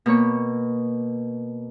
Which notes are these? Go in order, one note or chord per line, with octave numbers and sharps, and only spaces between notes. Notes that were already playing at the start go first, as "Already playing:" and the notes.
B2 A#3 C#5 C#6